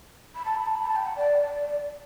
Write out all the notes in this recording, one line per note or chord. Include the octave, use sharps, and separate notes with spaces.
B5
A5
B5
A5
B5
A5
G5
F#5
D5